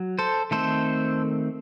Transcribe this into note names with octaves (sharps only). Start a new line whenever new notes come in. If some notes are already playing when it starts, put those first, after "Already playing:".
Already playing: F#3
A4 C5
D#3 A3 C4 A4 C5